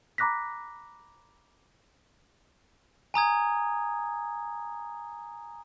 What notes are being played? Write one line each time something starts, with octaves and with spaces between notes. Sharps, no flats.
A#5 B5 D6 F#6 A#6 B6
G#5 A#5 D#6 G#6